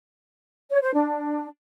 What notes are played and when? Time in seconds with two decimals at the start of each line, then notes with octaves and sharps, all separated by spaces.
0.70 C#5
0.82 C5
0.93 D4